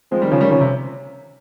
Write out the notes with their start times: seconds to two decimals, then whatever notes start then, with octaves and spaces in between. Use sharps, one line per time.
0.12 F3 G#3 C4
0.22 D#3 G3
0.31 C#3 F3 C#4
0.41 D#3 G3
0.51 C#3 F3 C#4
0.61 C3